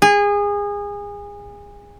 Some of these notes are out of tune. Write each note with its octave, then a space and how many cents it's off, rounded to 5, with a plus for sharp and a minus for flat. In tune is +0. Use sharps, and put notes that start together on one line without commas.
G#4 -25